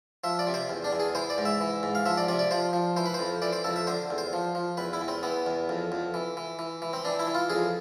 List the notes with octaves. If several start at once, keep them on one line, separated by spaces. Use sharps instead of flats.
F3 E5
D5
C3
C5
E2
D4
E2
G#4
E3 C5
D5
G#2
E5
E3
G#2
F5
F3 E5
D5
C3 D5
D5
F3 C5
F3
E3 C5
B4
C5
F2
E3 D5
C5
F2 A4
E5
D3 C5
E2
C5
F3
F3
E2 B4
E4
E2
C4
E3 B3
E2
F2
F2
E3
E3
E3
E3
C4
E3 D4
E4
E3
F4
F2 G#4